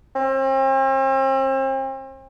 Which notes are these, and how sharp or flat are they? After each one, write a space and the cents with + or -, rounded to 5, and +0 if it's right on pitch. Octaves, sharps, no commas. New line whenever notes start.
C4 +40